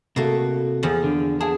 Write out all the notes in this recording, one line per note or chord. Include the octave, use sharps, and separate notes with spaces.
C3 A3 A#3 F#4
E2 F3
D3
B3 G#4 F5 A5